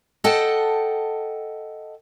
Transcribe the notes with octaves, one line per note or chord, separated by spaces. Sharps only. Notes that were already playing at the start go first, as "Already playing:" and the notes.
A4 D#5 F#5 G5 A5